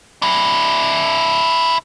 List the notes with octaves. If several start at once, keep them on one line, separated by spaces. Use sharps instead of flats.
D4 E4